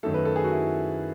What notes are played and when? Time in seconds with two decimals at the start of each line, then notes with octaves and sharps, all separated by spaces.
0.03 F#2 D#3 A3 A4
0.14 B4
0.25 A4
0.36 G#4
0.44 F#4
0.52 E4